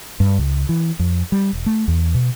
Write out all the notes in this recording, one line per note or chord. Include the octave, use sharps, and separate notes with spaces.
G2
C#2
E3
F2
G3
E1
A3
E2
B2